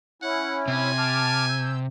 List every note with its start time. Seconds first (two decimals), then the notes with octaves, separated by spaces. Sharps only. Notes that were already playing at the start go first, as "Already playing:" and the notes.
0.22 C#4 E4 F#5
0.68 C3 G#5
0.98 A5 D6 F6
1.49 E6 G6